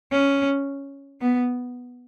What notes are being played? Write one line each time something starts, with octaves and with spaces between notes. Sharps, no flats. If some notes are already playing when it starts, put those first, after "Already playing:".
C#4
B3